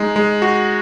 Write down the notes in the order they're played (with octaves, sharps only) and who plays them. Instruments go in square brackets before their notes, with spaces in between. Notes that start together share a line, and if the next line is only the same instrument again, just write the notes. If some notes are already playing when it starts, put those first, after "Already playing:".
Already playing: [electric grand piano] G#3 D#4
G#3
F#4